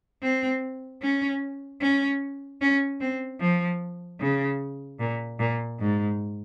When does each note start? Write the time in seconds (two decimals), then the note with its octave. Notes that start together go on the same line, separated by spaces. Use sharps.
0.23 C4
1.02 C#4
1.81 C#4
2.61 C#4
3.00 C4
3.40 F3
4.20 C#3
4.99 A#2
5.39 A#2
5.79 G#2